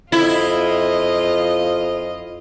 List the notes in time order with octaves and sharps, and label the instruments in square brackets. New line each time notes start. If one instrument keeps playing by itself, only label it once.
[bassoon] F2 [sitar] E4 [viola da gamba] F4 D#5